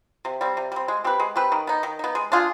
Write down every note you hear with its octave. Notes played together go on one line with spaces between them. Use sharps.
C3
G3 C4
C3
G3 C4
G#3
C4 G4 B4
G#3
C4 G4 B4
D#3
B3 D#4
D#3
B3 D#4
G#3
D4 F4 G#4